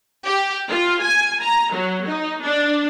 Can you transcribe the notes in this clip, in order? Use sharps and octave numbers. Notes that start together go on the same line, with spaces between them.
G4
F4
G#5
A#5
F#3
D#4
D4